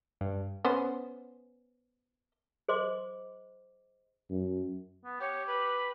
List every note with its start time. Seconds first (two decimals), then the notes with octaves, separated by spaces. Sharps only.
0.21 G2
0.65 B3 C#4 C5
2.68 G#4 C5 D#5 C6 D6
4.30 F#2
5.05 B3
5.21 G4 C#5
5.47 B4